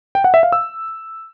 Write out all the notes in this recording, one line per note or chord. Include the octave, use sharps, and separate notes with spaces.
G5
F#5
E5
F5
E6